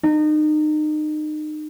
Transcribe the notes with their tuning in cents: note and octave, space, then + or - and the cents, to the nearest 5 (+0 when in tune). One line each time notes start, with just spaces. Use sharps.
D#4 -30